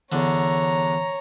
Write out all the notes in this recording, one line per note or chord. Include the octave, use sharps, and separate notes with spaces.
E2 D3 C#5 A#5